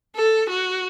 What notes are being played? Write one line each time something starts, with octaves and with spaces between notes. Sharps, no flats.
A4
F#4